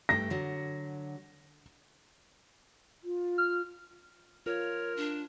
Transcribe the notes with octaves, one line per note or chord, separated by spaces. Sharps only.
G2 A3 G4 A#6
D3 F#3
F4
F6
F4 A#4 C#5
D4